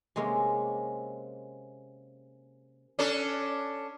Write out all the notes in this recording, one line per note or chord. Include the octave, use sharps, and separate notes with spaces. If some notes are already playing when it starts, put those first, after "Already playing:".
C3 G#3 A#3 C#4
C#4 D4 A4